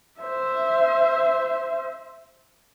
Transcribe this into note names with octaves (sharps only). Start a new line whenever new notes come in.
C5 E5